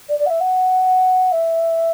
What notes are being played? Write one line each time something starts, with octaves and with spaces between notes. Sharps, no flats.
D5
D5
F#5
E5
F#5
E5